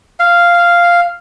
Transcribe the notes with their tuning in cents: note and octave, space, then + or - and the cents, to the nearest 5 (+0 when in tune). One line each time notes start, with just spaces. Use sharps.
F5 -5